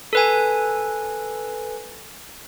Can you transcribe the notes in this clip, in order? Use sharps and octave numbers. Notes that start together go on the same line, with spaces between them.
A4 B4 G#5